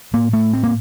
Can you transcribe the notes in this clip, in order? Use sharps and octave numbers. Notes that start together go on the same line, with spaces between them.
A2 A#3
A3
C4
A#3